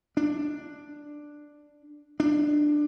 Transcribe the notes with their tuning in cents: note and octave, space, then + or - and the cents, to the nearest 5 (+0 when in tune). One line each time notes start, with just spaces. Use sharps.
D4 +5
D4 +15